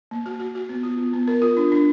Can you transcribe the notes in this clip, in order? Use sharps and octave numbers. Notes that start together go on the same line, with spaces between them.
A#3
F#4
F#4
F#4
B3
F4
B3
B3
A#4
F4
D4
D4